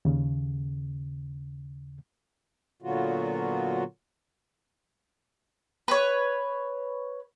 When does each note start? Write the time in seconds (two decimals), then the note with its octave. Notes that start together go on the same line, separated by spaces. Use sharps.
0.05 D#2 C#3
2.82 A#2 D3 F#3 B3 F4 F#4
5.88 B4 C#5